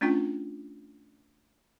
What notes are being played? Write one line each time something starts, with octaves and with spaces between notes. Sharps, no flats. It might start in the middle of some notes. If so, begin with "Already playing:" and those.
A3 C#4 D4 F4 G5